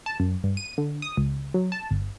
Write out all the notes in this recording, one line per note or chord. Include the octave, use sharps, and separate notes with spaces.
A5
F#2
G2
D#7
D3
D#6
C#2
F#3
A5
G1